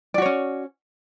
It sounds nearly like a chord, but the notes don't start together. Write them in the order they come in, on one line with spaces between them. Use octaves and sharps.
D5 F#4 C#5 C#4